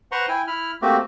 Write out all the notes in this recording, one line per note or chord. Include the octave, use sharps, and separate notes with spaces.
B4 C5 F#5 A#5 C6 C#6
E4 G5 G#5
E4 B5 F6
A3 A#3 C4 F#4 G4